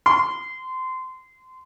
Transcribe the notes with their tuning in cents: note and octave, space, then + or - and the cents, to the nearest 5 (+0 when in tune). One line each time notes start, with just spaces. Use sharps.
C6 -25